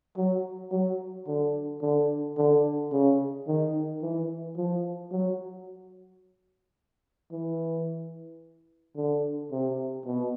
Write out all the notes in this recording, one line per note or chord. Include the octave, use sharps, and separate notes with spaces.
F#3
F#3
D3
D3
D3
C#3
D#3
E3
F3
F#3
E3
D3
C3
B2